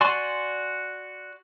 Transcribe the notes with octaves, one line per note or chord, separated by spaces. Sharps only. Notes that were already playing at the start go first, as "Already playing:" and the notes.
F#4 D5 G#5 C6 C#6